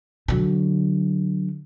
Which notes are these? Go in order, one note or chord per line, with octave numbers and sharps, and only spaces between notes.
D3 F#3